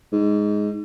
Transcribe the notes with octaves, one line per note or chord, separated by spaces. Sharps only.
G#2